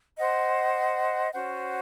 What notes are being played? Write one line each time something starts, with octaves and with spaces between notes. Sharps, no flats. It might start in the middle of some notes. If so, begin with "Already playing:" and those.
C5 D#5 F#5
C#4 F#4 C5 F#5